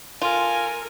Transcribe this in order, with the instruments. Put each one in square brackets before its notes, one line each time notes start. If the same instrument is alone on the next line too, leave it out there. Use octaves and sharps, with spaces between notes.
[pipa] F4 [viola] A4 A#4 [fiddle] G#5 [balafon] C6